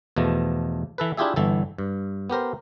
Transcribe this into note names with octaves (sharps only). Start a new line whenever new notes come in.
E2 B2 F3 A3
E3 A4 B4
D4 E4 F4 G4 G#4 E5
G1 E3 A4
G2
B3 G4 A#4 C5